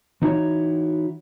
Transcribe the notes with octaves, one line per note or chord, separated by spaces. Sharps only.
E3 D#4 E4 F#4 C#5